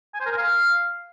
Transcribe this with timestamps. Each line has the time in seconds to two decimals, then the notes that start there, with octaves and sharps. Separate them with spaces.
0.15 G#5
0.20 C5
0.26 A#4
0.31 G#5
0.37 F5